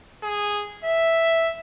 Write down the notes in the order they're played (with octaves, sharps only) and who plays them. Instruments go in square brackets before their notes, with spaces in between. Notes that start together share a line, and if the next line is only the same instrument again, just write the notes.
[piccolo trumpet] G#4
E5